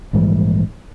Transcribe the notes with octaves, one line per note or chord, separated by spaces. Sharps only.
A#1 G#2 E3 G3